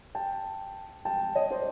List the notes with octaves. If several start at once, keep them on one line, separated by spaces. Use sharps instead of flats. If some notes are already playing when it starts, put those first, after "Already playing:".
G5 A5
G5 A5
C#5 D#5
C5 D5